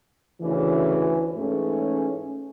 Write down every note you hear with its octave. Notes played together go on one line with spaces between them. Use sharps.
D2 C#3 E3
G#2 E3 A3 C#4 G#4